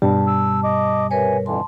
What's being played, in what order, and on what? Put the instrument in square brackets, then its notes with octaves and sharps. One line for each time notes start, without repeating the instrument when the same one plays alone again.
[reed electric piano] G2 B2 G3 [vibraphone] A5
[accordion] E6
D#5 D6
[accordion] C3 G#5 [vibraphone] A#4 B4 C#5
[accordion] F2 D3 E3 [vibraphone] A5 C6